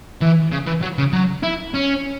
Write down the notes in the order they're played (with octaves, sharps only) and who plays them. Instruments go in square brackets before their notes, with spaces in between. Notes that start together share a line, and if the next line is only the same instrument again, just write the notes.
[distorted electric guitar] E3
C#3
E3
F#3
C#3
F#3
E4
C#4